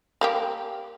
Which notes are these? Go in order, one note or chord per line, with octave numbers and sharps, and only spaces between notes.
G3 A#3 G4